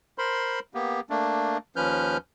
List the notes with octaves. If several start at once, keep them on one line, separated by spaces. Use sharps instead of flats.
A#4 C5 B5 C6
A#3 B3 G4
A3 A#3 D4
D#2 F3 C#4 B4 F6 G6